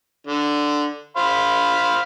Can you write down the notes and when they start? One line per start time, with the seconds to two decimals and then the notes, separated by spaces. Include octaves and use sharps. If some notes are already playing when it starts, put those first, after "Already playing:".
0.27 D3
1.17 C5 F5 B5